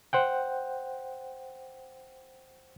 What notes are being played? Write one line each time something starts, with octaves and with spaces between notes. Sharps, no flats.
C5 F#5 G5